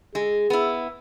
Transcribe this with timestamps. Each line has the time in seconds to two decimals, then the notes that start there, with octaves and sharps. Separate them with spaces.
0.15 G#3 G#4
0.50 B3 E4